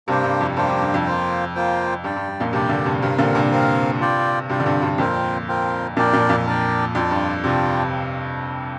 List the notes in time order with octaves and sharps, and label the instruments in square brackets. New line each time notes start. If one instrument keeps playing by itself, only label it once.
[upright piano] G2 C3 [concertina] A#3 D4 G4 C5 G5
[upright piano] G2
F2
[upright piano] G2 [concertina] A#3 D4 G4 C5 G5
[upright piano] G2
G2
F2
[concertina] A#3 F4 C5 G5
A#3 F4 C5 G5
[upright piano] G2 [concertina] G4 D5 G5
[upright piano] G2
G2
F2 A#2
[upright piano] G2 C3 [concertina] G4 D5 G5
[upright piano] A#2 D3
G2 C3
[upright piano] G2 C3 [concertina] C4 A#4 F5
[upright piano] A#2 D3
G2 C3
[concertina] C4 A#4 F5
F4 D5 G5
[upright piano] G2 C3 [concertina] F4 D5 G5
[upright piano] D3
G2 C3
G2 C3
[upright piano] F2 A#2 [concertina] C4 F4 A#4 G5
[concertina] C4 F4 A#4 G5
[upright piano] F2 A#2 [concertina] D4 A#4 D5 G5
[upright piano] F2 A#2
F2 A#2
[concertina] D4 A#4 D5 G5
[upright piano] F2 [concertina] D4 F4 D5 G5
[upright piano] G2
[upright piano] C3 [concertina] D4 F4 D5 G5